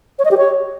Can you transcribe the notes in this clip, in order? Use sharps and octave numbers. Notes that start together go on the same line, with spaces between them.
C#5
D#5
G4
C#5